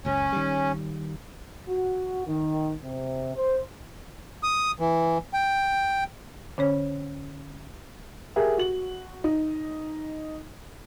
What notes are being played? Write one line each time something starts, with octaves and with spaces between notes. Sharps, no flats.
F#1 C#2 C#4
D#3 G3
F#4
D#3
C3
C5
D#6
E3
G5
D3 C#4 C#5
G4 G#4 A#4 E5
F#4 F#7
D#4